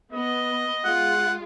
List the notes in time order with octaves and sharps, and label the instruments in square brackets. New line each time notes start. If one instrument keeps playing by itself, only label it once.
[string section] B3 [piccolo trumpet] D#5
[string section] G#3 F4 [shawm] F#5